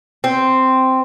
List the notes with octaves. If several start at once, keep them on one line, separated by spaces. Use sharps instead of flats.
C4